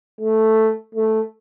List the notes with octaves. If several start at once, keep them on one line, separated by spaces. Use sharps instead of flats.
A3
A3